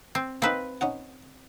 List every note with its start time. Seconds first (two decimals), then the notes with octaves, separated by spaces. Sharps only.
0.15 C4
0.42 A#3 C4 D#4 B4
0.81 C#4 D#4 F#5